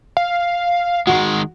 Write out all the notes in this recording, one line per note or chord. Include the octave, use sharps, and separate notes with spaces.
F5
D#3 G#3 F#4